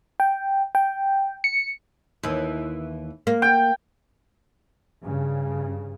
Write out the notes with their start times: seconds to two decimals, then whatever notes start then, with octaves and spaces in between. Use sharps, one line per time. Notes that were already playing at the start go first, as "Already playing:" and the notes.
0.20 G5
0.75 G5
1.44 C#7
2.23 D#2 E3
3.27 A#3
3.42 G5
5.03 G2 C#3